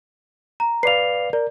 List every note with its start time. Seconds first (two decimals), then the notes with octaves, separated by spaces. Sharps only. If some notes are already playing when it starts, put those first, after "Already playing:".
0.60 A#5
0.83 B4 D5 F5 C7 F7
1.33 A#4 D5